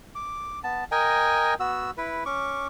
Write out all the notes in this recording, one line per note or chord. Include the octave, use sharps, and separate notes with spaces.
D6
B3 A5
A#4 D#5 G5 G#5
B3 F#4 E6
E4 B4
C#4 C#6 D6